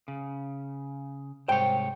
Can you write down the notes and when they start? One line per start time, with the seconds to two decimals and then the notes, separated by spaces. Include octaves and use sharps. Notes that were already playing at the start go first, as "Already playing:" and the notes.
0.08 C#3
1.48 C2 G#2 C5 C#5 G5